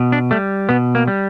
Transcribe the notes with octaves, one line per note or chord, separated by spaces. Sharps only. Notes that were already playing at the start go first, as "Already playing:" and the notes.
Already playing: B2
D4
G3 A3
B2 B3
A#3
G3